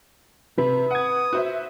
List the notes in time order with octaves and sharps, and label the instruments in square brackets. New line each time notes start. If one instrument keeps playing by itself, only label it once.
[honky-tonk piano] C3 [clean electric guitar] B4
[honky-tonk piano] F#5 G#6 [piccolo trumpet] D#6
[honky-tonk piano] F#4 C5 E5